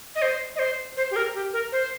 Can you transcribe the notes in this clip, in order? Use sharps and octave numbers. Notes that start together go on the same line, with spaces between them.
D#5
C5
D#5
C5
C5
G4
A#4
G4
A#4
C5